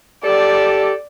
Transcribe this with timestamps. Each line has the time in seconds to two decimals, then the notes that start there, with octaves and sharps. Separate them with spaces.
0.24 G4 A4 D5